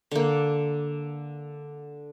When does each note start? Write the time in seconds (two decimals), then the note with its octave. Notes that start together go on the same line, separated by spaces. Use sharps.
0.11 D3 A#3